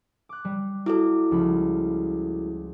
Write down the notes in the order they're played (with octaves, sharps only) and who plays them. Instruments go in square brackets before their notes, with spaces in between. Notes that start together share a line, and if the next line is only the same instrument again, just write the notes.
[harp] D6 F#6
G3
[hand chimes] E4 F#4 A4 [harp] D6
[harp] C#2 F3 B5